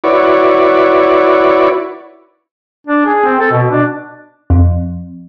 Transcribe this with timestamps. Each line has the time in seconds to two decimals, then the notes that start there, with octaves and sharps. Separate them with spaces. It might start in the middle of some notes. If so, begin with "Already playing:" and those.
0.04 E4 F#4 B4 C#5 D5
2.87 D4
3.05 G#4
3.24 C4
3.40 A4
3.51 B2
3.71 D4
4.50 F2